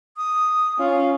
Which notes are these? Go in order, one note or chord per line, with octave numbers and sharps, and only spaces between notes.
D#6
C#4 F4